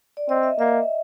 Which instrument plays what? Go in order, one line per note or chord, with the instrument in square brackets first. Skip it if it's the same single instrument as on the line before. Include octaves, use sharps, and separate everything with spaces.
[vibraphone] D5
[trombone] C4 [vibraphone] D#5
[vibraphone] E5
[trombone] A#3 [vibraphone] E5